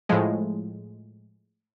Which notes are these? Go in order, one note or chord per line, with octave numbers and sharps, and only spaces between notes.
A2 F3 G#3